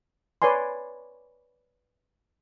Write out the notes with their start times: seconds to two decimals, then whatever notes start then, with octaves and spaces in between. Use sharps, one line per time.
0.42 B4 C#5 D5 G#5 C6